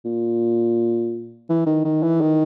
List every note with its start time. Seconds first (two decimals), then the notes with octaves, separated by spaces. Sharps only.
0.05 A#2
1.49 E3
1.66 D#3
1.85 D#3
2.03 E3
2.21 D#3